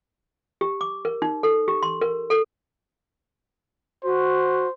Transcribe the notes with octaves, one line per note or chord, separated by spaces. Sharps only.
G4
D6
A#4
D#4
A4
G4
C6
A#4
A4
F#4 C5